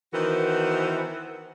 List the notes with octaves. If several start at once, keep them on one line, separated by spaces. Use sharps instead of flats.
D#3 E3 B3 F#4 A#4 C5